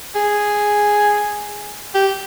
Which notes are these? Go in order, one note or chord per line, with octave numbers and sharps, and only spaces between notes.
G#4
G4